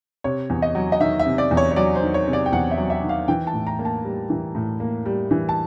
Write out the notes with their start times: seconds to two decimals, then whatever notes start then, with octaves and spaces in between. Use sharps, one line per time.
0.24 C3 C#5
0.50 E2
0.62 D#5
0.75 F#3
0.92 D#5
1.00 D#3 E5
1.19 E5
1.26 C3
1.38 D5
1.51 E2
1.57 C#5
1.71 C#5
1.76 F#3 D5
1.95 C5
2.02 D#3
2.14 C#5
2.27 C3
2.33 D5
2.46 G5
2.52 E2 F#5
2.71 E5
2.78 F#3
2.90 E5
3.03 D#3
3.09 F5
3.28 E3 G5
3.47 A5
3.53 A2
3.67 A#5
3.79 A#3
3.85 A5
4.04 G3
4.30 E3
4.55 A2
4.80 A#3
5.06 G3
5.31 E3
5.49 A5